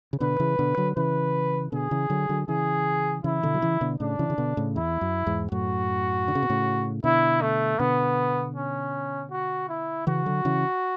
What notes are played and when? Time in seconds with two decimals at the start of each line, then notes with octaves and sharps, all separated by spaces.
0.13 C#3
0.20 B2 D3 B4
0.40 C#3 E3
0.59 B2 D3
0.77 D3 F#3
0.96 C#3 E3 B4
1.72 B2 D3 G#4
1.91 C#3 E3
2.10 D3 F#3
2.29 D3 F#3
2.48 C#3 E3 G#4
3.24 C#3 E3 E4
3.43 B2 D3
3.54 F#3
3.62 C#3 E3
3.81 B2 D3
4.00 A2 C#3 D4
4.19 C#3 E3
4.30 C#3
4.38 B2 D3
4.57 A2 C#3
4.76 E2 E4
5.01 F#2
5.26 E2 G#2
5.52 F#2 A2 F#4
6.28 D3
6.35 C#3
6.43 B2
6.50 A2 C#3
7.04 B2 D3 E4
7.42 A3
7.79 B2 D3 B3
8.56 C#4
9.31 F#4
9.69 E4
10.07 C#3 E3 F#4
10.26 D3 F#3
10.45 C#3 E3